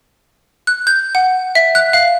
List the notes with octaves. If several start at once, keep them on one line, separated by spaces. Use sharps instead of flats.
F#6
G6
F#5
E5
F#6
F5